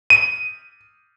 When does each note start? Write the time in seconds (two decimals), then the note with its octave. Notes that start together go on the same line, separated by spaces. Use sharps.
0.10 D#7